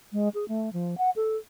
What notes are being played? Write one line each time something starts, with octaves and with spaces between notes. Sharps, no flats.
G#3
G#4
A3
F3
F#5
A4